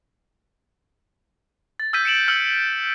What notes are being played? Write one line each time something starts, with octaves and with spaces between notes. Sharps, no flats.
A6
E6 F6 G6 G#6 B6 D#7
C#7 D7 E7 F#7
E6 F6 C#7 F#7
F#7